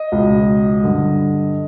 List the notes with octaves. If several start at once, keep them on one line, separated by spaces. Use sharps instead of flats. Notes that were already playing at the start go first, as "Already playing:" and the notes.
Already playing: D#5
C#2 B2
G2 D3